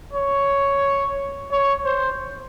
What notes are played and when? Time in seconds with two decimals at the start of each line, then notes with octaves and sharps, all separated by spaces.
0.13 C#5
1.52 C#5
1.85 C5